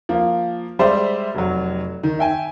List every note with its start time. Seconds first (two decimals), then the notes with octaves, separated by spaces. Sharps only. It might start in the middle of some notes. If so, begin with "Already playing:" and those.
0.09 F3 A#3
0.79 G3 G#3 C5 D5 E5
1.35 F1 F#3
2.03 D#3
2.19 E5 G5 G#5